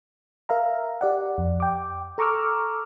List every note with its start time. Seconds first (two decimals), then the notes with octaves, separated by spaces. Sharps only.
0.49 A#4 E5 F5 A#5
1.01 G4 D5 F#5
1.38 F2
1.60 G5 D6
2.18 A4 A#5 C#6 D6 E6 F6